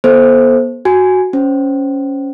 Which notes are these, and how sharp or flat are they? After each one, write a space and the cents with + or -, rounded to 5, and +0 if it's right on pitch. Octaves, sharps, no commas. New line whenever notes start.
B3 -40 A4 -15 C5 +0
F#4 +0 G#5 +0
C#4 +0 C5 -5